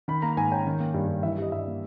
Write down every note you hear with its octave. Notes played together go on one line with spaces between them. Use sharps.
D#3 B5
A#3 A#5
G#2 G#5
C#4 G5
D#3
A#3
G2
G2
E3 E5
G3 D#5
G2 E5
A#3